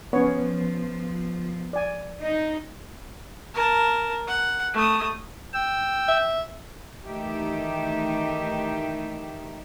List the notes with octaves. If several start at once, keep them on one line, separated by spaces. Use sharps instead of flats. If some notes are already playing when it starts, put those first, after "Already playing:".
F3 B3 C#4 C#5
D5 G#5
D#4
A#4 A5
F#5
A3 D#6
G5 E6
E5
D#3 E3 A3 D#4 G4 E5